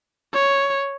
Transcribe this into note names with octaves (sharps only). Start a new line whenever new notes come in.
C#5